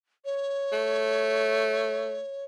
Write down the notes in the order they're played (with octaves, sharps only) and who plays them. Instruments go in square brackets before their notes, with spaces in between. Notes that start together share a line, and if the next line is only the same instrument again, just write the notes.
[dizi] C#5
[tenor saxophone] A3